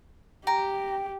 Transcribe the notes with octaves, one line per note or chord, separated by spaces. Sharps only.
G4 G5 A#5